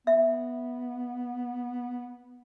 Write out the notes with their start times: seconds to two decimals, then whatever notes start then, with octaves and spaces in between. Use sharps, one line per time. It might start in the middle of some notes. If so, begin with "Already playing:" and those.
0.07 B3 E5